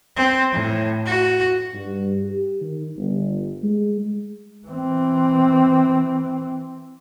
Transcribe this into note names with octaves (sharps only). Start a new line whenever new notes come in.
C4
A2
F#4
G2
G4
D#3
G1
G#3
E3 C4